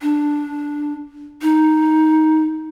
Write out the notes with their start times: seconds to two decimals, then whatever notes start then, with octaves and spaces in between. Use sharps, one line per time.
0.02 D4
1.42 D#4